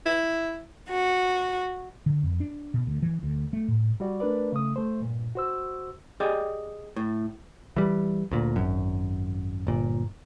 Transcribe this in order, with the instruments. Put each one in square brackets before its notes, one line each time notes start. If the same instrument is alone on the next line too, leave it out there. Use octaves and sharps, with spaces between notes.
[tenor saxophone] E4
[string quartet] F#4
[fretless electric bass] D3
F2
D4
B2
D2
E3
D2
A3
A2
[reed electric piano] G3 F#4 D5
A3 D4 A#4 B4 D5
C#3 A3 D#6
A3 C5
G2 A#2
F#4 C5 E6
[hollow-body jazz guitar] G4 G#4 D5 D#5
A2
[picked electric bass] E3 G3
D2 A#2
G#1 F#2
G1 A#2